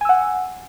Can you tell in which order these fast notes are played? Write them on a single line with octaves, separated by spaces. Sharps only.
G#5 E6 F#5